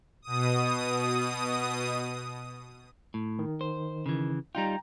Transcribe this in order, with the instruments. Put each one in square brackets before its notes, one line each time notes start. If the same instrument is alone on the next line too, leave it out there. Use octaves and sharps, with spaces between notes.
[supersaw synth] B2 D#6
[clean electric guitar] A2
[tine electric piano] D#3
[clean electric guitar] C5
C#3 E3
[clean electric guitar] G3 D#4 F4 [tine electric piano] G5 A#5